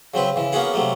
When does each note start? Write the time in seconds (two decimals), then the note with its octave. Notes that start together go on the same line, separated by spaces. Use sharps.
0.14 C#3 F#3 C4 B4
0.36 C#3 E3
0.53 A#3 B3 C#4 F#4 G#4 F#5
0.74 C3 F#3 A3 A#3